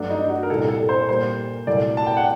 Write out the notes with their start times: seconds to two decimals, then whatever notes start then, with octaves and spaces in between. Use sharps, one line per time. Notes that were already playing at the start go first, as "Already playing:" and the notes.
Already playing: G2 F#3 A3 D4
0.10 D#4
0.24 D#4
0.30 F#4
0.43 A#4
0.49 C2 A#2 G3 A4
0.69 A4
0.89 C5
1.09 A#2 G3 A#3 C5
1.67 C2 A#2 F#3 A3 D5
1.97 A5
2.06 G5
2.17 F#5